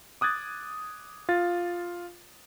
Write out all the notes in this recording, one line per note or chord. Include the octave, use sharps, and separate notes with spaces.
D6 D#6 F#6 G#6 A6
F4 A6